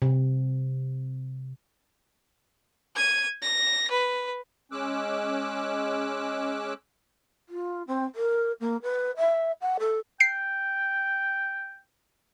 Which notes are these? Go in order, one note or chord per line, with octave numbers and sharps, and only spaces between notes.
C3
G#6 D#7
A#6
B4
G#3 C#4 D6 E6 F#6
F4
C4
A#4
A#3
B4
E5
F#5
A4
G5 C7 D7